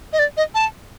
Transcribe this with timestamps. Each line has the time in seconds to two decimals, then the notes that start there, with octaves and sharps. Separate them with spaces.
0.13 D#5
0.19 D5
0.37 D#5
0.54 A5